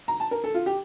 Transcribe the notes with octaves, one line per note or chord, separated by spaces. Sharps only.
A#5
A5
A#4
A4
F4
G4